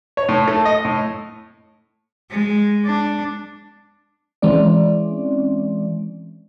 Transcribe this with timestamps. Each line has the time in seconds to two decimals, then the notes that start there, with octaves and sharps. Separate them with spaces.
0.17 C#5
0.29 A2
0.48 A3
0.65 D#5
0.85 A2
2.31 G#3
2.86 D4
4.42 E3 G#3 C4 C#4 D5